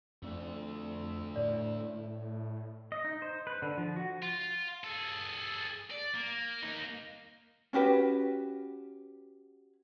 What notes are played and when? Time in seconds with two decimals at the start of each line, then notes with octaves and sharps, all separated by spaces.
0.22 F2 A3 D4
1.36 A2 D5
2.92 D#5
3.05 D#4
3.22 C5
3.47 B4
3.62 D3
3.78 F3
3.96 F#4
4.22 F4
4.84 G#4 A4
5.91 D5
6.14 A#3
6.63 A#3 D#4
7.73 C#4 F#4 G4 B4